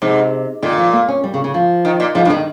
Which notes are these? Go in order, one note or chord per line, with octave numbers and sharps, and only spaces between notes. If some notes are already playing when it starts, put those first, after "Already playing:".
G#2 C3
A#2 D#3
F3
A#3
C#4
G3
C#3
C#3
F3
D#3
A#2
G#2 F3
G2
D#3